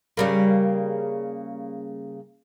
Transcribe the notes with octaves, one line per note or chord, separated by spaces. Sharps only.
C#3 G3 A#3